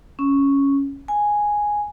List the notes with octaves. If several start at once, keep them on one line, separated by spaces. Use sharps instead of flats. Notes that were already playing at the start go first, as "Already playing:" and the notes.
C#4
G#5